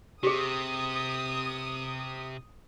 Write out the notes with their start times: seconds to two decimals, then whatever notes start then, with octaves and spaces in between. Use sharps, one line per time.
0.23 C3 G4 G#4 D#6